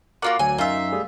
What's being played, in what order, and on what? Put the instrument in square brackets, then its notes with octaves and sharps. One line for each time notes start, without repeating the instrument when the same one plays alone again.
[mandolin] A#3 F4 D5 [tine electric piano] F#4 A#4 F#5
[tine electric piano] D2 F#3 [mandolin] G#5
[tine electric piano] F#2 D#4 [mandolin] F4 E5
[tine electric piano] G3 A3 G#4